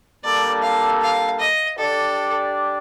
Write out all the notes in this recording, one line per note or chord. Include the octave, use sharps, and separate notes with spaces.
G3 A#3 D4 A4 D5
F5
F5
D#5
D4 G4 A4 D5